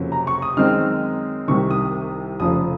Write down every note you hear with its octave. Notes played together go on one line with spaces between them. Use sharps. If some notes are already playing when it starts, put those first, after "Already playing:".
Already playing: F#1 F2 C3 F#3 C#4
A#5
C#6
D#6
F#2 D#3 G#3 C4 D#4 F6
C2 C3 D#3 C#6
D#6
F1 F2 C#3 F3 D#6